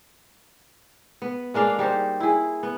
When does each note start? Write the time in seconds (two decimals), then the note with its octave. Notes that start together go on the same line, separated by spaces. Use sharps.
1.22 B3
1.54 G#3 A#3 D4 F5
1.79 G3 D#4 C5
2.20 E4 G#4
2.63 B3